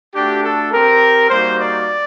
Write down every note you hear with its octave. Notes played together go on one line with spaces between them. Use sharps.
A3 D4 F#4 G4
A4
C4 G4 A#4
G3 A#3 D#4 F#4 C5
D5